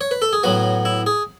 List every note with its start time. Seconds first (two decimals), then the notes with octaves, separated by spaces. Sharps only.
0.01 C#5
0.11 B4
0.22 A4
0.33 G#4
0.43 A2 F#3 B3 F#4
0.85 E4
1.06 G#4